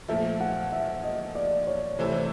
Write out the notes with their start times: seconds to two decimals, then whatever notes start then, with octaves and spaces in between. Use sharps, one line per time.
0.08 A#2 F3 A3 E5
0.40 F#5
0.72 E5
1.04 D#5
1.35 D5
1.67 C#5
1.99 C3 E3 A3 C4 E4 C5
2.13 C#5